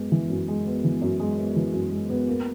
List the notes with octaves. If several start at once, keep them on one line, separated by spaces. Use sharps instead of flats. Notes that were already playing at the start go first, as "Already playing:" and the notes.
Already playing: F#2 G#3 B3
E3
F#2
G#3
B3
E3
F#2
G#3
B3
E3
F#2
G#3
B3
A#3